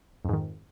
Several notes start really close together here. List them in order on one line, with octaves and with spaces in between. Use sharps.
F2 G#2 D#3